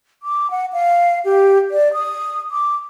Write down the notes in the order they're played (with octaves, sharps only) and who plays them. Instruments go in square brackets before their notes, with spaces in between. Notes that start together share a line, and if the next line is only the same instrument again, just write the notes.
[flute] D6
F#5
F5
G4
D5
D#6
D6